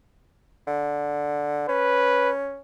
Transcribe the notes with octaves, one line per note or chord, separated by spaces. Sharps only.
D3
C#4 B4